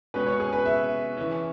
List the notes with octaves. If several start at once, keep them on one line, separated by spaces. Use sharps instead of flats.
B2 G#3 C#4 B4
C#5
G#4
B4
E5
E3 C#4